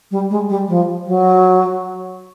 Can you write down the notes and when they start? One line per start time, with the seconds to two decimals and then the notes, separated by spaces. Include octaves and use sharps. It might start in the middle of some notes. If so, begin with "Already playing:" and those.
0.11 G3
0.30 G#3
0.49 G3
0.68 F3
1.06 F#3